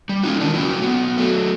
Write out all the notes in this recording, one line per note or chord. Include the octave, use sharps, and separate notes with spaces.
G3
G#3 A3 C#4 D#4 F#4
D#3 F3 A3 D4 D#4
F#3 A#3 E4
F#3 B3
F#3 A3